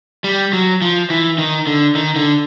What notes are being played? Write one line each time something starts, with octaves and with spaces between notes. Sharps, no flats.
G3
F#3
F3
E3
D#3
D3
D#3
D3